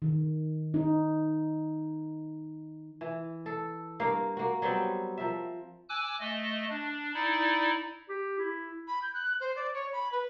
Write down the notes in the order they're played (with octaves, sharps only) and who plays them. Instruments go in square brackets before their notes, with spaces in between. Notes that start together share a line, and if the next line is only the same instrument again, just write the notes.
[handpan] D#3
D#4
[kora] E3
A4
G2 A#3 F5
A#3 F#4
F#3 G3 B3 C4
F3 A#4 E5
[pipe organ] G#5 D6 E6 F#6
A3 D#5
D4
D#4 E4 D5
[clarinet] G4
E4
[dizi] B5
G6
F#6
C5
D5
C#5
B5
B4